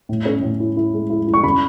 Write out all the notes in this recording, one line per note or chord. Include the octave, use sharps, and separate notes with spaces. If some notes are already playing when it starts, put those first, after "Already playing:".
A2
C#4
A2
E4
E4
G#3
E4
E4
C#6
C#3 B5